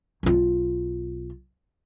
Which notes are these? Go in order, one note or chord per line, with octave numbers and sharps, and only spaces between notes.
B1 F4